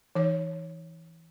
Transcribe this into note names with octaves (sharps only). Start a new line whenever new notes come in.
E3 D#4 C#5